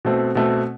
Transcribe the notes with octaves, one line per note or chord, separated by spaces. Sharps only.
B2 A3 C4
B2 A3 C4